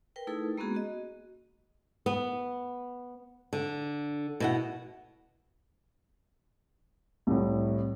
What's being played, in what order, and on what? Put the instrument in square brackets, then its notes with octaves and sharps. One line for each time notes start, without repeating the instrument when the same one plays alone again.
[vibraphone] A#4 B4 G5
A3 D#4 E4 G#4 A4 B4
G#3 A#3 B3 C#4 F#4 G#4
F#4 D#5
[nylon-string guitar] B3
D3
B2 E4 F#5
[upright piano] C2 A2